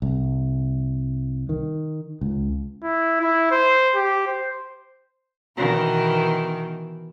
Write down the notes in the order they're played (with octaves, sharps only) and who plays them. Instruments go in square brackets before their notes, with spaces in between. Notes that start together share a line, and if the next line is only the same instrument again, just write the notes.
[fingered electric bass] C2
D#3
C#2
[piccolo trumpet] E4
E4
C5
G4
C5
[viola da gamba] B2 D#3 E3